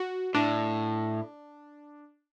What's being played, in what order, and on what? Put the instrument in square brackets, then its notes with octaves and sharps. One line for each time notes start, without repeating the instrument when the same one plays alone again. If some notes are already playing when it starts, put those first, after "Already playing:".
Already playing: [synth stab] F#4
[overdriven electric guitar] A2 [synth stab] D4